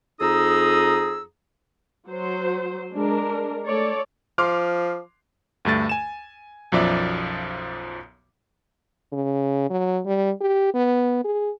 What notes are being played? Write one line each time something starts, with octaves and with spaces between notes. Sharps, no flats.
F2 D#4 G#4 A#5 D#6 E6
F#3 C5
G#3 D4 A#4
A3 A4 C#5 D5
F3 C6 D6 F6
D2 G2 A3 A6
G#5 E7
B1 F#2 F3 D5 E5
C#3
F#3
G3
G4
B3
G#4